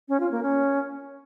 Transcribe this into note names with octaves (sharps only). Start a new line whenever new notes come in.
C#4
F4
A#3
C#4